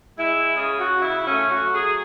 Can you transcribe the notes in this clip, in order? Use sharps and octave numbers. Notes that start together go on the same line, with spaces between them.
G#3 E4
C#3 G#4
F#4
C#3
E4
A3 C#4
F#4
F#3
G#4